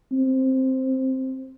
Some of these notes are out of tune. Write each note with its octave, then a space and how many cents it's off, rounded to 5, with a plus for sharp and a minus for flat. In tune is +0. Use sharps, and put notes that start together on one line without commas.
C4 +5